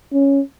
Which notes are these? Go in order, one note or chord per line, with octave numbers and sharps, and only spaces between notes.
C#4